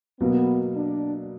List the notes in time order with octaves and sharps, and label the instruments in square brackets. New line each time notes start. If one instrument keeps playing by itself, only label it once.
[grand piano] B2 F#3 A#3 [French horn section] B3
[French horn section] D4